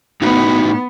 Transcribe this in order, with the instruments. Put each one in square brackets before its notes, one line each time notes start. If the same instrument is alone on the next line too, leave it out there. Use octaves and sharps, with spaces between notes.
[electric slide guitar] A2 D#4 F#4 [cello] B3